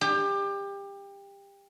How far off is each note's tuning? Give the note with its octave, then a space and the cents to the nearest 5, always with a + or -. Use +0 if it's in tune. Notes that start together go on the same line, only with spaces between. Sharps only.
G4 +25